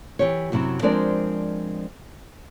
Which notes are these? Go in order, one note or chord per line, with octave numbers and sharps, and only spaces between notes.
E3 G4 C#5
F#2 C3 F#3 E4
F3 G#3 C4 D4 A#4 D5